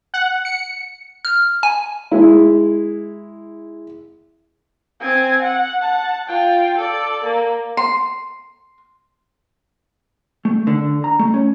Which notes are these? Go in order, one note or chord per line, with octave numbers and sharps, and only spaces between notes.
F#5
C#7
F6
G#5
G#3 E4
C4 G#5
F#5
F#5 A5
F4 G5
A4 D5
A#3
C6
A3
D3
A#5
A3
C#4